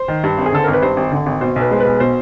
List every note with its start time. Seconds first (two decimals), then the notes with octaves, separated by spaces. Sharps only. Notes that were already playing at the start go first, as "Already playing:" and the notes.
Already playing: C5
0.08 D#3
0.24 G2
0.38 G#1
0.46 G#4
0.53 D3 A4
0.64 G#1 A#4
0.73 B4
0.82 G2 C5
0.97 G#1
1.12 D3
1.26 G#1
1.41 B2 C5
1.56 B1
1.61 B4
1.71 G#3 C5
1.80 B1 B4
2.00 B2 C5